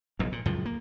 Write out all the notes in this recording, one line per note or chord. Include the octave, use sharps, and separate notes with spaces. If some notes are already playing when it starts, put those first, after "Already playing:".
F1 B1 E2
A#2
C#2 F#2 A2 F3
A#3